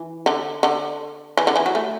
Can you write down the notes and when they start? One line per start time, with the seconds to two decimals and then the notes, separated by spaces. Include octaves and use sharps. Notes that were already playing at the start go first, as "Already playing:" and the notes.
Already playing: E3
0.26 D3
0.63 D3
1.37 E3
1.47 D3
1.56 E3
1.66 F#3
1.75 A3